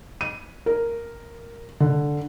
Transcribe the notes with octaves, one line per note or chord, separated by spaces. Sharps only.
D#7
A#4
D3